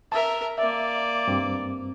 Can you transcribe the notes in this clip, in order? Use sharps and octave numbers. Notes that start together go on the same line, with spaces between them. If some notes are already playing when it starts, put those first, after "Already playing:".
A#4 E5 A5
A#3 D5 E5
G2 C4